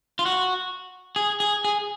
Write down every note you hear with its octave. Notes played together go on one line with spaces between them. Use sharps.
F4
F#4
G#4
G#4
G#4